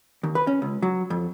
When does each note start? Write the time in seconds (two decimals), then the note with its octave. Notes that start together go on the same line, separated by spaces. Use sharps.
0.23 D#2
0.35 B4
0.47 C#4
0.62 C#2
0.82 F#3
1.10 F2